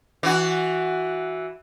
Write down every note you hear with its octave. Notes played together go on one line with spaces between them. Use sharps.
E3 F#4